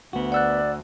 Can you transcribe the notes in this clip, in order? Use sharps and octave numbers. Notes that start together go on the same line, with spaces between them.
D2 B3 F#4
D5 F#5 E6 F#6